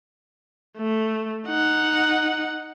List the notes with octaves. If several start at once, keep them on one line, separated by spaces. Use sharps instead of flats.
A3
D#4 F#5